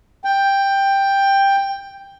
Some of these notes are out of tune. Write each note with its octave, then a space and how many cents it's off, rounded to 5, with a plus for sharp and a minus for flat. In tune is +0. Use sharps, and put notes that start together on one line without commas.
G5 +10